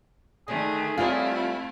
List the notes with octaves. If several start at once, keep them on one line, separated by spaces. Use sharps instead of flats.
D3 D#3 A3 G#4
E3 G3 A3 C4 E4 F4 C5